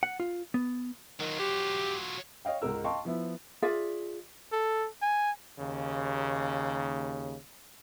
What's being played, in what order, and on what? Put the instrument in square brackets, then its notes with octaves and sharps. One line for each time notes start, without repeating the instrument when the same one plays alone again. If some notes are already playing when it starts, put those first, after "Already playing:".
[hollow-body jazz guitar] F#5
F4
B3
[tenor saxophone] D#3 [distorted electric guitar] F#3 F4
[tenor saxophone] G4
[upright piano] C#5 D#5 F5 G5
C#2 G#2 G#3 A#4 E6
D#5 F5 G5 A5 C6 C#6
F3 B3 E4
[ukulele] F4 G#4 D5 E5
[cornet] A4
G#5
[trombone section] D#2 C#3